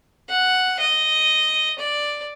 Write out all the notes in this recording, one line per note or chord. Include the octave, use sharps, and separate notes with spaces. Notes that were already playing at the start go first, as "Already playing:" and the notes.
F#5
D#5
D5